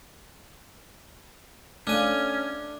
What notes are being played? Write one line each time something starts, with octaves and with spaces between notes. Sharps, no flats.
A3 C#4 D4 F5 G#5